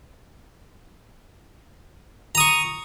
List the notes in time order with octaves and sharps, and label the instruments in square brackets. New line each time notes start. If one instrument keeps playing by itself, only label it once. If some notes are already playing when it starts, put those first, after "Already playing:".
[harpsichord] A#5
D#6
C#6